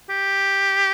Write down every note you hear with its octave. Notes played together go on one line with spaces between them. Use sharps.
G4